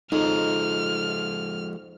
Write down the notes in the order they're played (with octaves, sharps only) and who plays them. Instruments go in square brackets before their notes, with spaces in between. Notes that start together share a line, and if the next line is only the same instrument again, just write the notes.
[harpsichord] F2 [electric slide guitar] F3 G#3 [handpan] D#4 [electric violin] F6